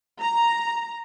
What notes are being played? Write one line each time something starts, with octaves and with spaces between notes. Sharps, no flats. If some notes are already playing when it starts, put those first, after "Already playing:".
A#5